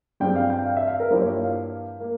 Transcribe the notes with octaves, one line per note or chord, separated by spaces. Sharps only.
G2 G3 C4 F4 G#4 G5
F5
G5
F5
E5
F5
A#4
G2 F3 A#3 E4 G4 C5
C#5
F5
F5
A#3